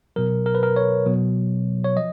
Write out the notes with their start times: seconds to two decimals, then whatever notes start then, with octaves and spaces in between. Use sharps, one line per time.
0.16 B2 F#3 A#4
0.46 A#4
0.55 B4
0.63 A#4
0.76 C#5
1.06 B2 F#3
1.84 C#5
1.96 F3 D#5